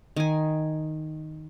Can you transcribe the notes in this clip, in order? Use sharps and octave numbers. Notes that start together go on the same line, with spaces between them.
D#3 G#5